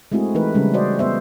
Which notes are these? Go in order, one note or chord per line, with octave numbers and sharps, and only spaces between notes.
G#3 A3 C4 E4 F#4 G#4
E3 A3 D#4 A#4 B4
C#3 G3 G#3 C#4
F#4 C5 D5 D#5
B3 C5 E5